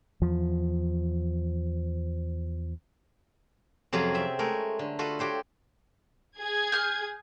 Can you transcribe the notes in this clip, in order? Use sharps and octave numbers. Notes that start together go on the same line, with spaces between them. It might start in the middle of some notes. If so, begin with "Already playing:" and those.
E2 F3
F2 C3 F#3 C#4 F4 G#4
C4 E5
G#3 A3 A#4 C#5
D3
F4 F#4 A4 B4
F#4 G4 C5 C#5
G#4 G#6
F6 G6